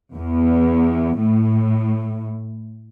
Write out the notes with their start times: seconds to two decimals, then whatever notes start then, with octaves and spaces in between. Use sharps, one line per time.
0.15 E2
1.19 A2